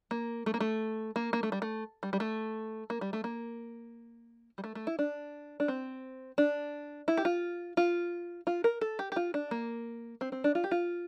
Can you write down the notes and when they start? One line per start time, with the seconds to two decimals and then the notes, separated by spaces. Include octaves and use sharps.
0.11 A#3
0.46 A3
0.54 A#3
0.60 A3
1.16 A#3
1.33 A#3
1.43 A3
1.52 G3
1.62 A3
2.03 G3
2.13 G3
2.20 A3
2.90 A#3
3.01 G3
3.13 A3
3.24 A#3
4.58 G3
4.64 A3
4.75 A3
4.87 E4
4.99 D4
5.60 D4
5.68 C4
6.38 D4
7.08 E4
7.17 G4
7.25 F4
7.77 F4
8.47 F4
8.64 A#4
8.81 A4
8.99 G4
9.12 G4
9.16 F4
9.34 D4
9.51 A#3
10.21 C4
10.32 C4
10.44 D4
10.55 F4
10.64 G4
10.71 F4